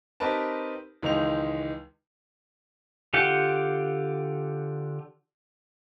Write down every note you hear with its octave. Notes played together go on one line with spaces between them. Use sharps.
C4 D#4 G4 A#4 B4 A5
C#2 D#3 E3 G#3 D#4 F7
D3 F4 G4 F#5 G5